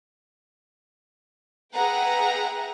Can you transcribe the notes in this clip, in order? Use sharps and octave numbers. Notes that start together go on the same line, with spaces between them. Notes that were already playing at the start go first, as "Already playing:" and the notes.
G#4 B4 E5 F#5 G5 A#5